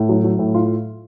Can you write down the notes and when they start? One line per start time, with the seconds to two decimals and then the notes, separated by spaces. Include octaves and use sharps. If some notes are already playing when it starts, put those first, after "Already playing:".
Already playing: A2
0.09 F#3
0.24 F#3
0.39 A2
0.55 F4